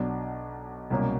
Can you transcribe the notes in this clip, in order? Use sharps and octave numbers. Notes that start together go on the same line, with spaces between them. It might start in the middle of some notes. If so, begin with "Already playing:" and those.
Already playing: B1 B2 F#3 B3 D4
C2 B2 F#3 A#3 C#4